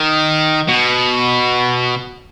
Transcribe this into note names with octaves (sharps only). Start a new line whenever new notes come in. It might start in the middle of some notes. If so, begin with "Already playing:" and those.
Already playing: D#3
B2